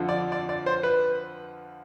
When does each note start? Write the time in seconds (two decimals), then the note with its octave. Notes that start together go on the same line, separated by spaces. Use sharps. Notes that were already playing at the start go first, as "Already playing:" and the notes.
Already playing: F2 D3 F3
0.09 D5
0.32 D5
0.49 D5
0.66 C5
0.83 B4